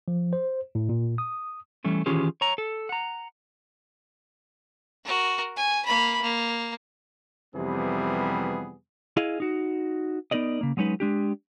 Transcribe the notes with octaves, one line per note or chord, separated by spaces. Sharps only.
F3
C5
A2
A#2
D#6
E3 G3 A3 C#4
D#3 E3 C#4 F4 G4 G#4
C#5 A#5
A4
F#5 A#5
F#4 A#4
G#5
A#3 B5
A#3
F2 C3 E3 G3 B3 G#4
E4 G#4 D#5 F5
D#4 F#4
B3 D#4 A#4 D5 D#5
C#3 A#3
F#3 G#3 C#4 D#4 B4
G#3 D4 G4